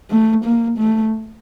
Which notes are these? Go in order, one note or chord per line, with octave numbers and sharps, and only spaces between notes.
A3
A#3
A3